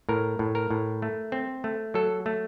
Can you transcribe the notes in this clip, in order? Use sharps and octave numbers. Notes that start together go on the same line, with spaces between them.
A2 A#4
A2
A#4
A2
A3
C4
A3
F#3 A4
A3